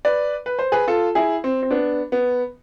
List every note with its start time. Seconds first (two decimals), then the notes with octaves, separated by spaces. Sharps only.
0.05 B4 D5
0.46 B4
0.59 C5
0.72 G#4 B4
0.87 F4 A4
1.15 E4 G#4
1.44 C4
1.63 C4
1.71 B3 D4
2.12 B3